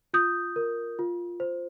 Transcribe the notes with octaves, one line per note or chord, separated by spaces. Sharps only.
F4 D#6 G6
A#4
F4
C5